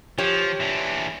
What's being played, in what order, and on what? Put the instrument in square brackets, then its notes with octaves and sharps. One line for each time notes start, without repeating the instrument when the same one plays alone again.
[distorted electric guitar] F3 [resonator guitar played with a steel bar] G4 C#5
[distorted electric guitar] E3 D4